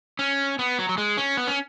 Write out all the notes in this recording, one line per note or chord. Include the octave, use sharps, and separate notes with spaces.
C#4
B3
F#3
F#3
G#3
C#4
B3
C#4